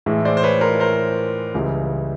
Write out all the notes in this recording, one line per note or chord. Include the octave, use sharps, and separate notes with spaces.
A2 E3 G#3
C5 D5
C5
B4 C#5
A#4 C5
A#4 C5
C#2 C#3 E3 G3